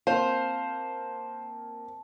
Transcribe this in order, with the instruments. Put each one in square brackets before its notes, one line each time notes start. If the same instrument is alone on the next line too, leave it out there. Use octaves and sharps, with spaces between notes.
[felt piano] A#3 C4 [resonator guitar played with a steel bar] F4 [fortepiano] C5 [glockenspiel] A5